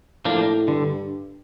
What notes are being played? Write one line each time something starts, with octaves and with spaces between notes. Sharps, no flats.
A2 F3 A#3 D4
G2 D3